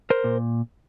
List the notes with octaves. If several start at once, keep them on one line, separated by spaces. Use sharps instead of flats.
A#4 C5
A#2